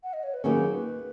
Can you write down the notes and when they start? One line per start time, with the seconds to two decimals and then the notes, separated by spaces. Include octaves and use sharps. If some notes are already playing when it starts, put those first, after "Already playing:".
0.03 F#5
0.13 D#5
0.23 C#5
0.34 B4
0.44 D#2 D#3 F#3 C#4 G#4
0.73 B4